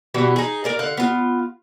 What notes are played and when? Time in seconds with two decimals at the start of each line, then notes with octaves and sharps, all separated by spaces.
0.14 B2 E3 G3 F#4
0.36 D#4 G#4
0.64 A#4 D5 F5
0.79 D3 F5 F#5
0.97 B3 F4